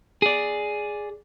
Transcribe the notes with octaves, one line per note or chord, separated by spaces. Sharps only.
G#4 D5